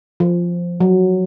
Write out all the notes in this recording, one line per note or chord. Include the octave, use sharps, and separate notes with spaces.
F3
F#3